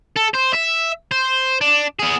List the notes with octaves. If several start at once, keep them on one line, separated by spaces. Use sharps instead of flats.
A4
C5
E5
C5
D4
B3 G#4